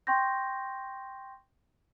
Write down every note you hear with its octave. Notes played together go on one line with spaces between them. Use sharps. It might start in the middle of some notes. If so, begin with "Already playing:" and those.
G5 C6 C#6 G6 A#6